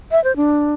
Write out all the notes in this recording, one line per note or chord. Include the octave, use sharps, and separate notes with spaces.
E5
C5
D4